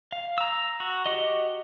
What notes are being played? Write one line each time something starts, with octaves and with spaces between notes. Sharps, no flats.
F5
A#5 E6
F#4
F#4 G4 D#5